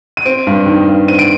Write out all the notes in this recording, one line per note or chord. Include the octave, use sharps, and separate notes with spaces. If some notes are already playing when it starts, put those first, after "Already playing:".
D#7
C4 D7
G2
D#3
G2
C4 D#7
D7